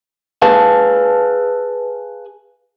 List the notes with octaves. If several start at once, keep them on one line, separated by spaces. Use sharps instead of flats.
G#4 B4 F5 A5